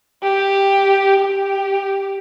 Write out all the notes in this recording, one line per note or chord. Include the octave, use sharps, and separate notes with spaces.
G4
G4